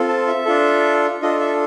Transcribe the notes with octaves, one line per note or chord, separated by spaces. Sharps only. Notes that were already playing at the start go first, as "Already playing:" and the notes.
Already playing: C4 F4 A4
A5
E5
D4 F4 A4
D4 F4 A4 D#5
E5